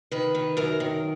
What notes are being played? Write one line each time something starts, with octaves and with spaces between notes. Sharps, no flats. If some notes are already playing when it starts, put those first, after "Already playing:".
D#3 B4
D#3
F#2 A#4
D#3